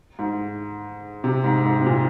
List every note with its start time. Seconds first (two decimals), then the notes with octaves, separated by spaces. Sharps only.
0.19 G#2
1.24 C3
1.44 G#2
1.65 G#2
1.81 C3
1.86 A#2